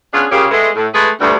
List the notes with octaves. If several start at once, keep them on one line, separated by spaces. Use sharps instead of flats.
B3 C#4 D4 F4 G#4
A#2 C#3 A#3 C#4 G4 G#4
G#3 A3 B3
A2
G#3 A3 G#4 B4
D2 E3 G3